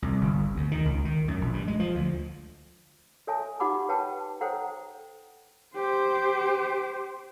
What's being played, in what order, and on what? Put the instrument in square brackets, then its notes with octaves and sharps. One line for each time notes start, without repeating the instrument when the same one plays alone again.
[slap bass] C2
G1
D2
D#3
C#2
D#3
F#2
A#1
G2
G#3
F3
D2
[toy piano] A4 C#5 E5 G#5 A5
D#4 G4 F#5 B5 D6
B4 C#5 F#5 G5 A5
A4 C5 C#5 F#5 G5 A#5
[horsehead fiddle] G4 C5